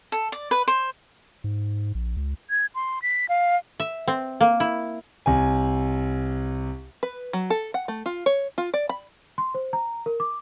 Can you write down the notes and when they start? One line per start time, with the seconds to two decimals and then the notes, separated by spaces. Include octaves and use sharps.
0.12 A4
0.32 D5
0.51 B4
0.68 C5
1.44 G#2
1.95 A#1
2.17 C#2
2.50 G#6
2.75 C6
3.02 B6
3.29 F5
3.80 E5
4.08 C4
4.41 A#3
4.60 E4
5.26 C2 G#5
7.03 B4
7.33 F#3
7.50 A4
7.74 F#5
7.88 A3
8.06 F4
8.26 C#5
8.58 F4
8.74 D5
8.89 B5
9.38 C6
9.55 C5
9.73 A#5
10.06 A#4
10.20 D6